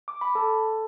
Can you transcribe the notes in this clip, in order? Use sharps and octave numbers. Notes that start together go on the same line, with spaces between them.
D6
B5
A4 A5